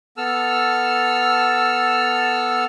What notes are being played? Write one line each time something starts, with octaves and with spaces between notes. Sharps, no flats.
B3 A4 A5 E6 F6